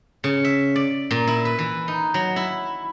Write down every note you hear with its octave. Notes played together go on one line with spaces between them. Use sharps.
C#3
E5
D5
A#2
E4
B4
E3
D#4
F#3
E4